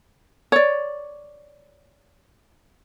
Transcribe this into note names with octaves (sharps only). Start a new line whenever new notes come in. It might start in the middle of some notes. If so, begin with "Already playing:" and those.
C#5 D5